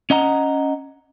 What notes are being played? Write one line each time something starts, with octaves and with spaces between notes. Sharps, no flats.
C#4 D#5 F#5 A#5